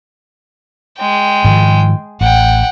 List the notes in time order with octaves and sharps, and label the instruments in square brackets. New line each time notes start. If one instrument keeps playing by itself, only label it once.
[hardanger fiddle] G#3 G5
[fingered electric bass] G#2 D#3 F3
[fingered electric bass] A1 [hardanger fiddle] F#5 G5